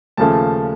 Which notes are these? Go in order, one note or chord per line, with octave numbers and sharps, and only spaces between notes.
D#2 C#3 F3 A3 A5